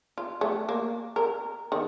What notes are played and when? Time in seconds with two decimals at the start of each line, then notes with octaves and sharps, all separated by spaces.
0.18 F4
0.41 A3
0.69 A#3
1.16 A#4
1.72 D#3